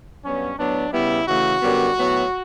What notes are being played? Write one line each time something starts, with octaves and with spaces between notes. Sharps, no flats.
G2 F#3 B3 C#4
A2 F#3 B3 D4
C#3 G3 B3 E4
C#3 E3 A3 F#4
F#2 D3 G3 B3
A2 F#3 B3